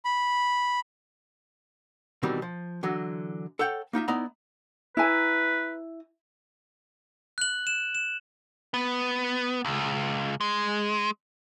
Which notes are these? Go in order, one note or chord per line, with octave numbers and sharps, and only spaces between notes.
B5
B2 D#3 E3 G3 C4
F3
D3 E3 F#3
A4 C#5 F#5 G5
A#3 D#4 F4 E5
B3 D#4 E4 D5 A#5
E4 B4 G#5 A#5
F#6 F#7
E7
E7
B3
C#2
G#3